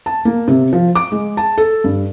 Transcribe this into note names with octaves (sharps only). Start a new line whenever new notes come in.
A5
A#3
C3
F3
D6
G#3
A5
A4
G2